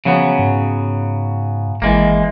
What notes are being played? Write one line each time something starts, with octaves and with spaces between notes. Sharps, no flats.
C#3 F3 F#3 B3
G#2
G#1 E3 G#3 A#3